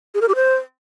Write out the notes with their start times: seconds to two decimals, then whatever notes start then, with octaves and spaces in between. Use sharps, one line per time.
0.15 G#4
0.21 A#4
0.28 G4
0.35 C5